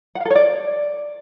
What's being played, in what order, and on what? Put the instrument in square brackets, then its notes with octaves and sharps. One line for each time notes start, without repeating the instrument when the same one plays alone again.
[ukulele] F#5
F5
A4
C#5
D5